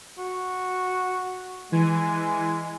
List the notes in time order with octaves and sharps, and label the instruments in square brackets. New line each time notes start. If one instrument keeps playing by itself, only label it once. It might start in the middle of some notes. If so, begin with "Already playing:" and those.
[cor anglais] F#4
[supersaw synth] E3 G#5 [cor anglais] G#3